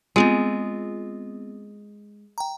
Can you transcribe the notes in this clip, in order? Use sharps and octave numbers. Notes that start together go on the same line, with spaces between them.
G#3 B3 C4 F4
G5 A#5